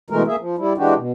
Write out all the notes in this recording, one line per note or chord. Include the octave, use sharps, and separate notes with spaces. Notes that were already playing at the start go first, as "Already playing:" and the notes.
B2 E3 G#3 A3 A#4
A#3 G#4 E5
F3
G3 E4
E3 G#3 D4 F#4 G4
B2